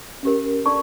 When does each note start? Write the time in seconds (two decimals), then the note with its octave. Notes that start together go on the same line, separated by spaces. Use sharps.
0.23 C#4 G4 A#4
0.65 D4 A4 D5 A5 C#6